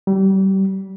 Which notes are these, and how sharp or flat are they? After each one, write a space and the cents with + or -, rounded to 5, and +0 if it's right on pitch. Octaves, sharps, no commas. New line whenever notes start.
G3 -30